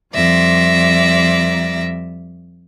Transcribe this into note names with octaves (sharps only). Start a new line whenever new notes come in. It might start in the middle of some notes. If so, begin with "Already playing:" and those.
F2 G3 D5 E5 A#6